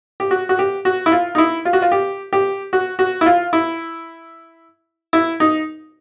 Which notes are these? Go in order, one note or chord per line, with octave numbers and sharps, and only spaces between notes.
G4
F#4
F#4
G4
F#4
E4
F4
D#4
E4
F4
F#4
F4
G4
G4
F#4
F#4
E4
F4
E4
E4
D#4